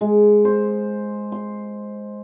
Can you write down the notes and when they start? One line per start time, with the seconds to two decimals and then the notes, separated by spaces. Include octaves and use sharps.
0.01 G#3
0.45 C5
1.32 C6